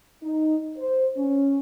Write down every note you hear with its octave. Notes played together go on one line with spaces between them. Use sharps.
D#4
C5
C#4